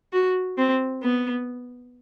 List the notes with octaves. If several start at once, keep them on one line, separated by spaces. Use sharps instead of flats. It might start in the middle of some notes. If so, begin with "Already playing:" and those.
F#4
C4
B3